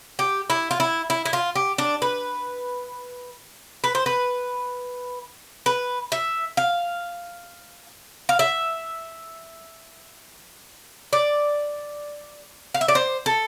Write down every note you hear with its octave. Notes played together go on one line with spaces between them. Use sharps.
G4
E4
F4
E4
E4
E4
F4
G4
D4
B4
B4
C5
B4
B4
E5
F5
F5
E5
D5
F5
E5
D5
C5
A4